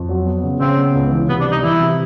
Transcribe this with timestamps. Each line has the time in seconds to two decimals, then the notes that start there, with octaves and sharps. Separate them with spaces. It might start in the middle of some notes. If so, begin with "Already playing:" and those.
Already playing: F2
0.09 F#3
0.25 B3
0.43 C#3
0.60 C#3 C4
0.77 B3
0.95 C#2
1.12 E3
1.29 C3 B3
1.40 D4
1.46 G3
1.52 D#4
1.63 E3 E4
1.80 C3